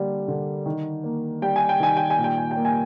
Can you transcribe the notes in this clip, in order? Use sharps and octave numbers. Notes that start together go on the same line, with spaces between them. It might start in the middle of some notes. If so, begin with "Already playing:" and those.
Already playing: D3 G3 A#3
D3
D#3
A#3
G3 G5
G#5
G5
D#3 G#5
G5
G#5
A#2
G5
G#5
G5
A#3
G#5